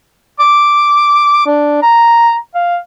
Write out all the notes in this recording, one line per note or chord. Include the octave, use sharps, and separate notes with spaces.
D6
D4
A#5
F5